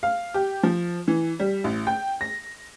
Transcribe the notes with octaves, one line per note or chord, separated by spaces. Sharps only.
F5
G4
F3
E3
G3
A1
G5
A#6